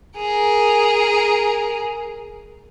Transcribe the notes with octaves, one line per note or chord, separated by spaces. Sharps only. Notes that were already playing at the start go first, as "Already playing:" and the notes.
G#4 A#4